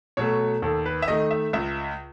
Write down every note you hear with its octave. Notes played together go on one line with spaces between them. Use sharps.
B2 F#3 A3 C#5
D#2 A4
B4
E5
D#3 A3 D#5
E5
C#2 E5